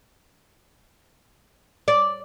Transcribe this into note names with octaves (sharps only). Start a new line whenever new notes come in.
D5